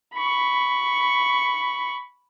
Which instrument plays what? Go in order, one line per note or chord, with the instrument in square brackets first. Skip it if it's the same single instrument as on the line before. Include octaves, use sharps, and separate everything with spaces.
[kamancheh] B5 C#6